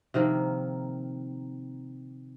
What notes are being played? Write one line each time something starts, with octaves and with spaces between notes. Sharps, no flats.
C3 D#3 F3 A#3